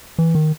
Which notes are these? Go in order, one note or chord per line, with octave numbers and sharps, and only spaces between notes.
E3
D#3